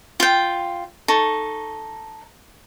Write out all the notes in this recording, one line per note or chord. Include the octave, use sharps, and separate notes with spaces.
F4 G5
D#4 A4 C#6